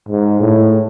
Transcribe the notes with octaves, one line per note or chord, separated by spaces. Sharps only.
G#2
A2